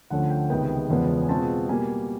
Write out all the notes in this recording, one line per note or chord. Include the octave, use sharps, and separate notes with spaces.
D2 D3 F3 A3 C#4 F#5
G5
C#2 C3 D#3 G#3 B3 G5
E2 C#3 F3 G#3 B3
G#5
B2 G#3 C4 F4 A5
B2 G3 A#3 G#5